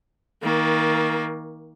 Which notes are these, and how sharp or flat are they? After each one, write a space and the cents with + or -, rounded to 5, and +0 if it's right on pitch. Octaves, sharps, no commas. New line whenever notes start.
D#3 +30 A#3 +10